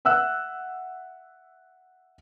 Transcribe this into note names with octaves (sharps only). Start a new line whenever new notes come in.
E5 F#5 E6 F#6